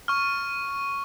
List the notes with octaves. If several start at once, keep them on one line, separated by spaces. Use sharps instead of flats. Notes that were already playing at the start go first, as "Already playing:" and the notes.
C#6 F6